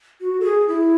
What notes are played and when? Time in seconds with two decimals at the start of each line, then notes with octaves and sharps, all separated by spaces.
0.21 F#4
0.40 A4
0.45 G#4
0.68 E4